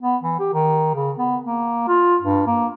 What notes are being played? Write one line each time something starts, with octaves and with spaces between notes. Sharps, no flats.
B3
E3
G4
D#3
C#3
B3
A#3
F4
G2
A#3